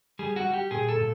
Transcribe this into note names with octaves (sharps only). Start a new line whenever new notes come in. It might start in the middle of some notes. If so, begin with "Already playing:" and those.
G3 G#4
F#4
G3
G4
A#2 G#4
A4
A#2